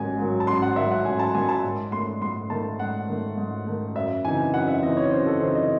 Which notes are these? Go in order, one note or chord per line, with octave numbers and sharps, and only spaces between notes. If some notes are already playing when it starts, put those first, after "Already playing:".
Already playing: A1 G#2 D#3 F#3 G#5
G#2 D#3 F#3
A5
A1 C6
F#5
G#2 D#3 F#3 E5
F#5
A1 G#5
A5
G#2 D#3 F#3 G#5
A5
G#2
D#3 A3 C6
G#2 C6
D#3 A3 A5
G#2 F#5
D#3 A3
G#2
D#3 A3
F#2 E5
C#3 E3 C4 D#4 G#5
F#2 F#5
E5
C#3 E3 C4 D#4 D#5
C#5
F#2 C5
A4
C#3 E3 C4 D#4 C5
D#5